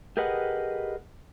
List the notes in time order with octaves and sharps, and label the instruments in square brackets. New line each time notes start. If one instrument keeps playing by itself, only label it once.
[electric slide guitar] G4 G#4 A#4 B4 D#5 F#5